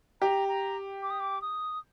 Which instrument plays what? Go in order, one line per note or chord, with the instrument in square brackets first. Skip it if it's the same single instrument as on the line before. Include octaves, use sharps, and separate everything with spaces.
[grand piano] G4 [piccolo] A#5
[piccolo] A#5
D6
D#6
D6
D#6